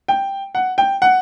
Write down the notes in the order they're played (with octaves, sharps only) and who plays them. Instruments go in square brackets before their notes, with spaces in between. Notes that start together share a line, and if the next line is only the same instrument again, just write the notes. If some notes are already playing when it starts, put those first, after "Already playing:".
[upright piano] G5
F#5
G5
F#5